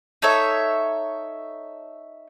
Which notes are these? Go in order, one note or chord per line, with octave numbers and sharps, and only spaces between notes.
D#4 A4 C#5 E5